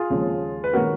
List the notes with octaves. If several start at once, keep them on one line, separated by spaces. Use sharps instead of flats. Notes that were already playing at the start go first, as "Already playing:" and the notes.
Already playing: F4 G#4
D#2 C#3 F3 G#3 C#4
B4
D#3 G#3 C#4 F#4 A#4